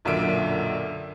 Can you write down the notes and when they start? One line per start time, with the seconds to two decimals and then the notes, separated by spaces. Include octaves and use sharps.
0.05 B1 F#2 A#2 D3 E5 D7